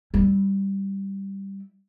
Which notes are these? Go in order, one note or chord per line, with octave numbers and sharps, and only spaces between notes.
G3 E4